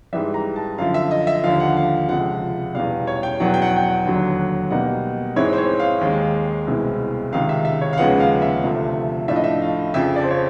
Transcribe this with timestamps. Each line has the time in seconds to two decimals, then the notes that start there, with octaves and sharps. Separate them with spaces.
0.13 G#2 E3 G3 E5
0.34 A#5
0.56 A5
0.78 F#2 D3 F3 F5
0.94 E5
1.11 D#5
1.27 E5
1.44 D#2 D3 F3 F5
1.60 F#5
1.77 F5
2.09 C#2 C3 F3 F#5
2.74 E2 B2 G3 F5
3.07 C#5
3.23 G5
3.40 E2 B2 F#3 F#5
3.54 G5
3.62 F#5
3.76 G5
3.83 F#5
4.05 D#2 D3 F#3
4.70 B2 G3 A#3 D#4 F#5
5.36 G#2 E3 G#3 C4 E4 C#5
5.53 C5
5.58 C#5
5.79 F5
6.01 D#2 D#3 G#3
6.67 C2 B2 G#3 C4 E4
7.32 C#2 C3 D#3 F5
7.49 E5
7.65 E5
7.81 C#5
7.93 F5
7.98 D#2 C#3 F3 G#3 B3 F#5
8.20 F5
8.42 E5
8.64 D2 C3 F3 A3
9.28 A2 F3 A3 D4 F4 E5
9.36 D#5
9.44 E5
9.62 F5
9.94 F2 C#3 F3 E5
10.16 D5
10.23 C5
10.31 C#5